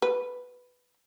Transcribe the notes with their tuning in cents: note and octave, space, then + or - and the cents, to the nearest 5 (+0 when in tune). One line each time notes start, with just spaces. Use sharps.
B4 +5